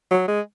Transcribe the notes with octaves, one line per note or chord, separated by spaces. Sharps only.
F#3
G#3